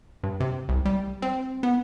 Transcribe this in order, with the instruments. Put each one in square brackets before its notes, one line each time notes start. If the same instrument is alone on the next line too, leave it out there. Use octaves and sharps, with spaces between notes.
[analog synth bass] G2
C3
C2
G3
C4
B3